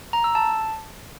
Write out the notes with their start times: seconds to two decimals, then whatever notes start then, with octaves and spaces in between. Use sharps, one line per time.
0.13 A#5
0.24 E6
0.35 A5